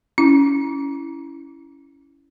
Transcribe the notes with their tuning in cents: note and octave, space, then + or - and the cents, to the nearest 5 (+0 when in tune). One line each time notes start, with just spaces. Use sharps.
C#4 +15 E4 +0